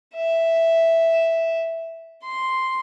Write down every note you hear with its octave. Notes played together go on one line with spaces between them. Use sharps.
E5
C6